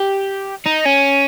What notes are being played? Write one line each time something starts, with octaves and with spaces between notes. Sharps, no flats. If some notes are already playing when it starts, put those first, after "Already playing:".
Already playing: G4
D#4
C#4